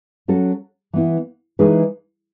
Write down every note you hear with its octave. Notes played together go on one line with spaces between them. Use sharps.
F#3 C#4 F#4 A4
E3 B3 E4
E3 G#3 D#4 G#4 B4